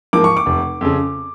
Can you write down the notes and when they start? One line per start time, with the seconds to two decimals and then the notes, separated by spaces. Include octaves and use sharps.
0.13 G#2 F3 A#3 D6
0.24 C#6
0.37 D6
0.46 F1
0.81 F2 C#3